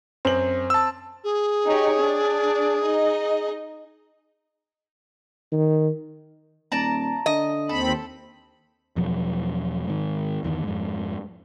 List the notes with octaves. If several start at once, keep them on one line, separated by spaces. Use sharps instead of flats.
F#2 C4 F#7
A5 E6
G#4
D#4 G4 C#5
D4 D5
D#4 D#5
D#3
D#1 D5 A5 A#5
D3 D#5
D#2 C4 A4 B5
E2 B2 F3 F#3
G#2 D#3
G1 E2 A#2 D#3
F2 G#2